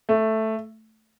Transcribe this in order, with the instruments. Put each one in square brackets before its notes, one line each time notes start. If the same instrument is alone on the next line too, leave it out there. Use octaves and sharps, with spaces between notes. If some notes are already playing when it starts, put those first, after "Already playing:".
[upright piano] A3